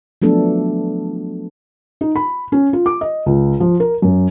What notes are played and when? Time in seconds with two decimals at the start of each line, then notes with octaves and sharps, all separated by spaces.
0.22 F3 F#3 A3 B3 D4 A4
2.01 D#4
2.16 B5
2.52 C#4
2.73 F4
2.86 D6
3.01 D#5
3.26 C#2
3.60 F3
3.80 A#4
4.02 F#2